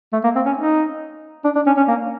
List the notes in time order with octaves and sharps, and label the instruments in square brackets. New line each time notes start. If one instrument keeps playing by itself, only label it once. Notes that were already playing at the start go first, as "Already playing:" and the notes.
[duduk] A3
A#3
C4
C#4
D#4
D4
D4
C#4
C#4
A#3